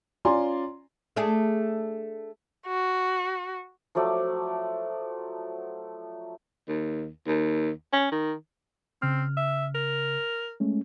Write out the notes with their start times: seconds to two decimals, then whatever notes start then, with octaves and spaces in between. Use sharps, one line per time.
0.25 C#4 F4 D5 G#5 A#5 C6
1.16 A3 D4 G#4
2.67 F#4
3.95 F3 F#3 A3 D5
6.69 D#2
7.27 D#2
7.93 C#4
8.12 D#3
9.02 C#3 C4 F6
9.37 E5
9.75 A#4
10.60 G#3 A3 C#4